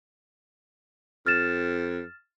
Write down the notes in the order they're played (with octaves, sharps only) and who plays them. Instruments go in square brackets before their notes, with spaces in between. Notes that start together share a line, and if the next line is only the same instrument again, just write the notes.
[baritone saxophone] F2 [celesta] F6 A6 E7